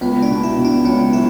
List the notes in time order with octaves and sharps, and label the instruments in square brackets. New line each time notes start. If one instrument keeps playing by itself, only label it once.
[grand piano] C#2 [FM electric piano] B3
[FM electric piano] D4
[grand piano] B2
[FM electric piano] E4
[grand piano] B2
[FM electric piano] D4
[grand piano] C#2 [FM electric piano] C#4
[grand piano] F#3 [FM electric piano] E4